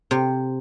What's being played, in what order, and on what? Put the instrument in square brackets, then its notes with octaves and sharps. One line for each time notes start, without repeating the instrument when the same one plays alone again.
[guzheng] C3